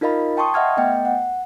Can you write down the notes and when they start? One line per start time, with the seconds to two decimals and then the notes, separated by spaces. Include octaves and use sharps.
0.01 D#4 F4 A#4 D#5 F5 B5
0.37 G5 A5 C6 C#6 D#6
0.54 D#5 E5 F#5 F6 G#6
0.77 A3 B3 D#5 G5
1.05 F#5